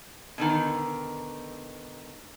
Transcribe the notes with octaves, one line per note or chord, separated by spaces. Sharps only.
B2 D3 D#3